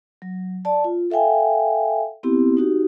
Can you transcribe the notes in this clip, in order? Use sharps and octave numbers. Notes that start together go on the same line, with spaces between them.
F#3
D5 A5
F4
A4 E5 F5 G5 G#5
B3 C4 E4 G4
D#4 F#4 G4